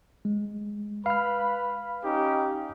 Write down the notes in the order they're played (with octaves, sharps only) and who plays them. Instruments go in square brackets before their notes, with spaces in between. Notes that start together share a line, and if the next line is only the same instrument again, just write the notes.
[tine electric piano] G#3
[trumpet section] B4 B5 [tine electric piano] F5 F6
[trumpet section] C#4 D#4 G4